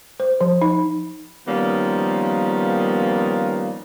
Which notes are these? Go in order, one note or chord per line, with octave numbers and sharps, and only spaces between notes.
C5
F3
D#4
D#3 F3 G3 A#3 B3 C#4